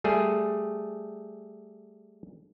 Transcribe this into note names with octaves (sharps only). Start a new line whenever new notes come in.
G3 A3 G#4